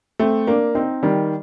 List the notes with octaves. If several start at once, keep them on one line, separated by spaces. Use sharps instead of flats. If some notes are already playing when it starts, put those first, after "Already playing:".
A3 C4
A#3 D4
C4 D#4
D#3 G3